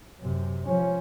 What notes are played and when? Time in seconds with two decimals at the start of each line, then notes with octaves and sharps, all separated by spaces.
0.20 F#2 C3
0.66 F3 C#4